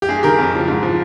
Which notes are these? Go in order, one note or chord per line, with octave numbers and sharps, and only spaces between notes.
G4
G2 G#4
D#3 G4 A#4
F2
C#3 F3
G#2
F3